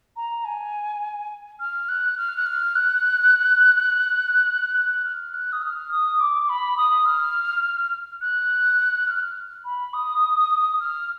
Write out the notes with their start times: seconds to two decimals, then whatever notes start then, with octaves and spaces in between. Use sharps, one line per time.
0.16 A#5
0.45 G#5
1.60 F6
1.89 F#6
2.18 F6
2.37 F#6
2.46 F6
2.75 F#6
4.76 F#6
5.05 F6
5.34 F#6
5.52 D#6
5.62 F6
5.91 D#6
6.20 D6
6.49 B5
6.78 D#6
7.06 F6
8.21 F#6
9.08 F6
9.65 B5
9.94 D#6
10.80 F6